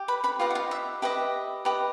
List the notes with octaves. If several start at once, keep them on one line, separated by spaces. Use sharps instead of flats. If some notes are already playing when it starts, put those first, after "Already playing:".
Already playing: G4
B4 B5
B4 B5
F4 G4 B4 D#5 F5
F#5
F4 F5
E5
G4 B4 D#5 E5
G4 B4 D#5